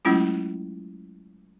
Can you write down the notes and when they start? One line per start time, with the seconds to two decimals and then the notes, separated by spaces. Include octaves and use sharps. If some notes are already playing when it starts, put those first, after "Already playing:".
0.05 F#3 G#3 A3 C#4 E4 F4